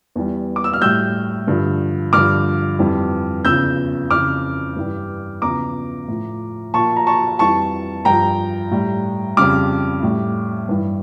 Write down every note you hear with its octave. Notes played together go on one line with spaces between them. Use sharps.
E2 E3 G3
D6
E6
F6
A2 G3 E6 G6
G2 D3 F3
G2 D3 F3 D6 F6
F2 E3 G3
E2 C#3 F3 E6 G6
F2 C#3 E3 D6 F6
G2 E3 G3
E2 C#3 F3 A#5 D6
A2 F3
A#2 F3 A5 C#6
A#5
A5 C#6
F2 E3 G3 A5 C#6
G2 F3 G5 A#5
A2 G3
F2 C#3 G3 D6 F6
A2 G3
G2 E3 G3